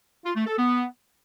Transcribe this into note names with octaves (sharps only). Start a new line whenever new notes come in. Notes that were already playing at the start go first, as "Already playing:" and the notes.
F4
A3
A4
B3